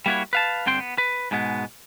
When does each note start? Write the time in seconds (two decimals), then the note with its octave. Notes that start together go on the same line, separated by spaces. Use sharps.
0.06 G3 A#3 E4 F#4 C#5
0.33 B4 F5 A5
0.66 G2 D3 C4 G5 C6
0.80 B3
0.98 B4
1.31 G#2 B2 G#3 B3